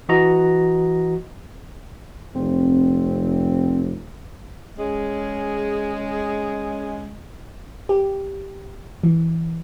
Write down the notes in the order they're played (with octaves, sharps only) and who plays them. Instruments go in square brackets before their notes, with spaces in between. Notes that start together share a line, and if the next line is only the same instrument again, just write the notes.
[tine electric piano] E3 F#4 D#5 A#5
[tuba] F1 [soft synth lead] C4
[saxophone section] G#3 C#4 G#4
[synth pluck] G4
E3